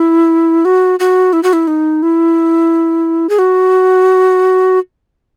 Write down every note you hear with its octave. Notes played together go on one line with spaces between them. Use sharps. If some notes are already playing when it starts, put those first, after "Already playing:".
Already playing: E4
F#4
F#4
E4
F#4
E4
D#4
E4
G#4
F#4